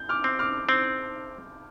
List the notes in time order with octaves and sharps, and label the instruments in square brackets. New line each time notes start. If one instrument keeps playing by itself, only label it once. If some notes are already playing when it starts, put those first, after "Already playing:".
Already playing: [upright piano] G6
D6 F6
[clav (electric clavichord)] C4
[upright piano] D6 F6
[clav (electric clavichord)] C4